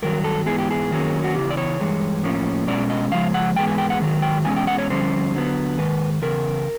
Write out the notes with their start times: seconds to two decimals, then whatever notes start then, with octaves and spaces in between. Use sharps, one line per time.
0.02 G2 D#3 F#3 A#4
0.24 A4
0.46 G#2 E3 G#3 B3 G#4
0.58 G4
0.71 G#4
0.91 F#2 D#3 F#3 A#3 C#4
1.24 F#4
1.35 E2 C#3 E3 G4
1.50 D5
1.57 C#5
1.80 G2 E3 G#3
2.23 A2 F3 A#3 C#4
2.67 B2 G#3 C#4 D5
2.90 D#5
3.11 C#3 F3 G#3 F5
3.34 F#5
3.56 G#2 E3 G#3 B3 G5
3.67 G#5
3.78 G5
3.90 F#5
4.00 G#2 D#3 F#3
4.22 G5
4.45 E2 B2 G#3 C#4 G#5
4.56 G5
4.67 F#5
4.78 C#5
4.89 F2 D3 G3 C#4 C5
5.33 D3 F#3 B3
5.78 G#2 D#3 B4
6.22 E2 C#3 A#4